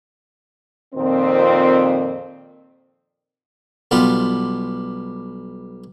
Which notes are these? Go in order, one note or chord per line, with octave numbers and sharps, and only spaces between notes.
F2 A#2 D#3 C4
B1 G3 B3 F4 G4